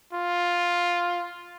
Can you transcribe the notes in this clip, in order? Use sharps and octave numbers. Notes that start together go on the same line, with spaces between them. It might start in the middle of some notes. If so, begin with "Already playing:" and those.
F4